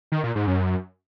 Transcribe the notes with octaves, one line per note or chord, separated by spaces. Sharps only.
D#3
A#2
G#2
F#2